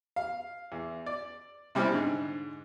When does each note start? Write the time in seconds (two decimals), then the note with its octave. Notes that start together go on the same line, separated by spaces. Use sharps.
0.16 F5
0.72 E2
1.06 D5
1.75 C3 G3 C#4 E4 C5 F6
1.92 G#2 D3